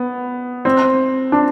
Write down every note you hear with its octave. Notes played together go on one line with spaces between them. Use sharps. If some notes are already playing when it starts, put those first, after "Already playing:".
Already playing: B3
C4
D4